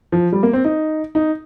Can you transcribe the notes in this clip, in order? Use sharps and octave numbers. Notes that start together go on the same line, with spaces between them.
F3
G3
A#3
C4
D#4
D#4